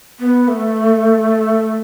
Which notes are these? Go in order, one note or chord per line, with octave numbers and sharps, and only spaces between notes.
B3
A3